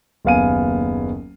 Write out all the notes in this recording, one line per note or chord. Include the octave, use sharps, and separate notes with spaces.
F#1 D#2 B3 F5 G#5 D#7